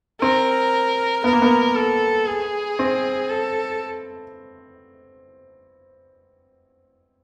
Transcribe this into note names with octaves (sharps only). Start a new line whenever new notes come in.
C4 A#4
B3 A#4
A#3
B3
A4
G#4
C4
A4